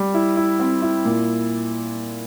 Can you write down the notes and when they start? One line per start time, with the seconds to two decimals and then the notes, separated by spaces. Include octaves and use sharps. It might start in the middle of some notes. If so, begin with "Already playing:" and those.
Already playing: G3
0.14 E4
0.37 E4
0.59 C4
0.82 E4
1.05 A#2